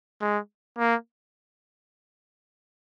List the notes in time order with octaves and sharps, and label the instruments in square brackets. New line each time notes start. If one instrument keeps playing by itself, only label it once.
[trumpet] G#3
A#3